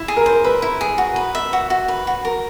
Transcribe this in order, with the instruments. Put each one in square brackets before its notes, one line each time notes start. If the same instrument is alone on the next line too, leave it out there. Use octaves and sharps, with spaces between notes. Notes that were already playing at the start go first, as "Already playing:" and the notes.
Already playing: [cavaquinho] E4
G#4
[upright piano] A#4
[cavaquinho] C5
[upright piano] B4 [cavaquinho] E5
[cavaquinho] E4
G#4
F#4
B4
E5
F#4
F#4
B4
F#4
A#4